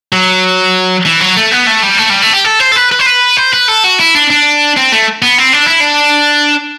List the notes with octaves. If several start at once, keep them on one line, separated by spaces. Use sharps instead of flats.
F#3
E3
F#3
A3
B3
A3
G3
A3
G3
A3
G4
A4
C5
A4
B4
B4
C5
B4
C5
B4
A4
F#4
E4
D4
D4
C4
A3
B3
C4
D4
E4
D4